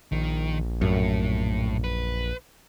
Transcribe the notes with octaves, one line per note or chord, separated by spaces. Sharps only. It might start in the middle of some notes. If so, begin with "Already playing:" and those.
A#1 D#3
F#2 A2
B4